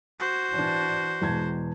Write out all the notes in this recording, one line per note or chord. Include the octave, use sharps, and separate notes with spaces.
F#4 C5
E3 D4
E2 B2 G#3 A5 G#6